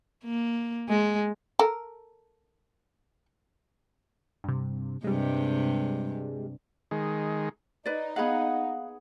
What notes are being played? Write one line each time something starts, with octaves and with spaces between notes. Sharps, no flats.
A#3
G#3
A4 A#4
G2 C3
G2 C3 G3 G#3
D#3 G#3
D#4 B4 D5
B3 G#4 F5 F#5 B5